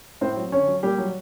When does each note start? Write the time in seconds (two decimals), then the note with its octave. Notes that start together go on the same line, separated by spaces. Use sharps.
0.21 A2 C4 C5
0.37 F#3
0.52 D3 C#4 C#5
0.68 F#3
0.83 A#2 G3 G4
0.98 F#3